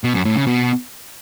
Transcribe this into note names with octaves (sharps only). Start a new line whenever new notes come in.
B2
F#2
A2
C#3
B2